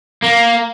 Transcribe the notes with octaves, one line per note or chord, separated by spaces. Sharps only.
A#3